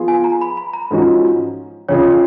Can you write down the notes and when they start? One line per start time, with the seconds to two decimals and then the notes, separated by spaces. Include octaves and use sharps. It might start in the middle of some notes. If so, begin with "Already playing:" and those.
Already playing: F3 B3 F4 G#4
0.08 G#5
0.24 A#5
0.41 B5
0.57 B5
0.73 A#5
0.91 G#2 F3 G#3 C#4 F#4
1.89 F2 C#3 F3 C#5